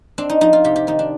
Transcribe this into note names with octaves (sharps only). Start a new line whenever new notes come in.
C4 D4
D#4
F3 D#4
F4
C3 G4
G4
D#3 D#4
D4